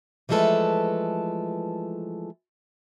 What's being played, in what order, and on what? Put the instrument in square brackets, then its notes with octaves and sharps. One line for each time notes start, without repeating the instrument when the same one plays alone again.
[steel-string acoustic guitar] E3 F3 G#3 A3 A4 B4